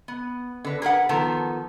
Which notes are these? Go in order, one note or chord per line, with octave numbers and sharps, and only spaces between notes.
B3
D3 B4
G#4 A#4 B4 F#5
D#3 F3 B3 A4 A5 A#5